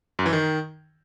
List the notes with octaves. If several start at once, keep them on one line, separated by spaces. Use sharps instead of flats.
F#2
E3
D#3